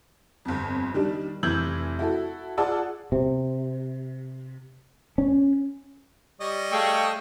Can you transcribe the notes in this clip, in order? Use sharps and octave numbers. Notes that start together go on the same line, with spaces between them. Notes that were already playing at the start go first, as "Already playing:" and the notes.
G1 F2
D#3 G3 D4
F1 E3 E6 G6 G#6 F#7
E4 F#4 A4
F4 G#4 D5 F#5 A5 E6
C3
C#4
G3 C#5 D#5
A3 G#4 F5 G5 C#6 E6